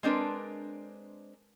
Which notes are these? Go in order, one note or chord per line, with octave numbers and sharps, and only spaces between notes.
G#3 C4 D4 A#4 B4